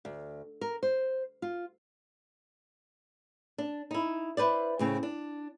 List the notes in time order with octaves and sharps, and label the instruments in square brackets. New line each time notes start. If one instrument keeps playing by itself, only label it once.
[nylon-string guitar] D2
A#4
C5
F4
D4
D#4 E4
E4 B4 C5 D5
A2 C#3 C4
D4